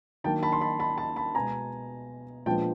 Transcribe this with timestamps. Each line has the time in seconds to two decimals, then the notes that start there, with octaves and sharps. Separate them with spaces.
0.24 D#3 F#3 A#3 D4 G5 A5
0.43 A5 B5
0.53 C6
0.61 A5 B5
0.80 A5 B5
0.98 A5 B5
1.16 A5 B5
1.35 B2 G#3 B3 G#5 A#5
2.46 A#2 F3 G#3 B3 D4 G5 A5